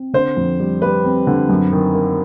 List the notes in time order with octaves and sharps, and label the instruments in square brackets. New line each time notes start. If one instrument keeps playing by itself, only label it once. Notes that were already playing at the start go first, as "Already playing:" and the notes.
Already playing: [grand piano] C4
[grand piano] D3 [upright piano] C5
[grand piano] F2
G3
[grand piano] G3 [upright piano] B4
[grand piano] C4
D3
F#2
D#3
A#3